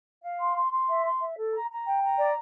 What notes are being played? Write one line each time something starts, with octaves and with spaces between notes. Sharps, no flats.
F5
C6
C6
C6
E5
C6
E5
A4
A#5
A#5
G5
A#5
D5